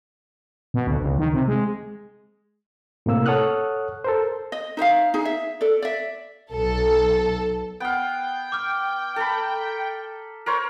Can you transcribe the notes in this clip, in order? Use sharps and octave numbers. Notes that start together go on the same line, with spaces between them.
B2
D2
C#2
D#3
C3
G#3
A2 C3 A#3 E6
A4 C#5 F#5 D#6 F6 F#6
A4 A#4 C5
D#5
D#4 C5 E5 F5
D#4 G#4
E5
A4 D5
D5 E5
B1 A4
B3 F5 G5
D6 F6
A4 A#5 B5
A#4 C5 C#5